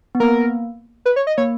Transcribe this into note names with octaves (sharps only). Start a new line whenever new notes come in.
B3
A#3 A#4
B4
C#5
D#5
A#3 C#5